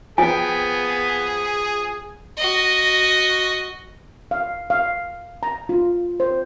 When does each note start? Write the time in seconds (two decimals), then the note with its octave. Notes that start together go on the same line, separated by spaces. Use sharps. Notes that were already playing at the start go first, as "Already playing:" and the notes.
0.18 F3 B3 G#4 G5 G#5
2.37 F#4 D#5
4.31 F5
4.70 F5
5.43 A#5
5.69 F4
6.20 C5